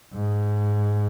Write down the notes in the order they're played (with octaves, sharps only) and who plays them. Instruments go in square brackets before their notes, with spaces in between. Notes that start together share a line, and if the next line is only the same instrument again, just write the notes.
[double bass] G#2